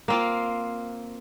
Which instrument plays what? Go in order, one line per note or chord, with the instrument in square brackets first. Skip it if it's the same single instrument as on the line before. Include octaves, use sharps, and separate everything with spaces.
[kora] A#3 C4 F4